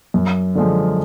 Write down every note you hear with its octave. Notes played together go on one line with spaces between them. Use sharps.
F#2
D3 F3 G#3